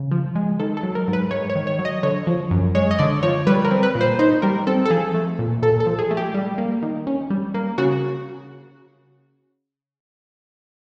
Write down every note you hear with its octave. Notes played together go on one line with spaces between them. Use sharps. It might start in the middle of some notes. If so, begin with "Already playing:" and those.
Already playing: C#3
F3
G#3
D#3 A4
A4
F#3
A#4
G#2
B4
G#2 C#5
C#5
D#3
C#5
F#3
D#5
D3 C#5
F3
F#2
G#3 C#5
D#5
D3 D5
F3 C#5
G3 B4
A#4
C4
B4
A#2
C5
D#4 C5
G3 A#4
C4 A4
A4
F3 G#4
A3
A#2
A#2 A4
A4
F3
G#4
A3
G4
G3
A#3
D#3
C#4
G3
A#3
C#3 F#4